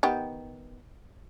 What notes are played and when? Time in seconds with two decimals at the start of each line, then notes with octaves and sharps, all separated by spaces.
0.03 D#3 B3 G4